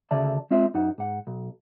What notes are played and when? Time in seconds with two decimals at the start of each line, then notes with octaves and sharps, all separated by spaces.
0.11 D2 C#3 D5 E5 A5
0.51 G#3 C4 F4 E5
0.74 F#2 D#4 F#5
0.98 G#2 F#5
1.27 B1